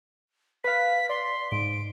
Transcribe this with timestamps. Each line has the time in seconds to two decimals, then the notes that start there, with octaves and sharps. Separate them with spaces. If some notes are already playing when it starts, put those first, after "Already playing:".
0.64 B4 F5 B6
1.09 D5 C6
1.52 G#2 D7